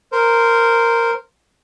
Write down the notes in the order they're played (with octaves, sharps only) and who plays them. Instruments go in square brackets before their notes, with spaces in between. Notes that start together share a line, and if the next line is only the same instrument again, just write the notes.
[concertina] A#4 C5